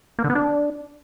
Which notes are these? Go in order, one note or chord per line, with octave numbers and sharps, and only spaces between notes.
A#3
D3
B3
D4